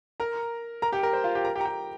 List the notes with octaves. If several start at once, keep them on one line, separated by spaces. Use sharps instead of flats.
A#4 A#5
A#4 A#5
G4 G5
A#4
C5
F4 F5
G4 G5
A#4 A#5
G4 G5
A#5
G4 G5